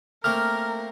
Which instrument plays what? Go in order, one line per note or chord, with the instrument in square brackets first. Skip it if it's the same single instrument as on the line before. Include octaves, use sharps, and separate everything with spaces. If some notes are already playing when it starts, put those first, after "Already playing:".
[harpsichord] A3 A#3 C4 [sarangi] A#4 [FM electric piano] F6